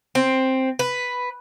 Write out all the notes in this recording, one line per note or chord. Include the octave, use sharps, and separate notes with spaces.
C4
B4